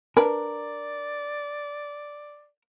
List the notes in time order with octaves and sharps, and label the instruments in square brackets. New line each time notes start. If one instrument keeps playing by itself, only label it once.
[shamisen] D4 B4 [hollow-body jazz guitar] A#4 [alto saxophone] D5